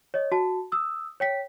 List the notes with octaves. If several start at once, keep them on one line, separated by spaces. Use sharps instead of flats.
C#5 D#5
F#4 A5
D#6 E6
C#5 G5 B6